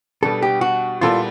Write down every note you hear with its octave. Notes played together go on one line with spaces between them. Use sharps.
B2 G3 B3 D4 A4
G4
F#4
A#2 G3 B3 E4 F4 A4